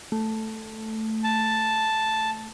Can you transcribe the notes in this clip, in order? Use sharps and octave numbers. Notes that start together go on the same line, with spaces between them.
A3
A5